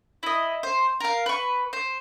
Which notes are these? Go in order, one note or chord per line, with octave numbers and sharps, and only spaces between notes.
E4 D#5
C5
A#4 F5
B4 C#6
C5